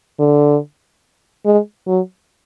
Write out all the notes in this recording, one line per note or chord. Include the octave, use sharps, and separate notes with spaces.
D3
G#3
F#3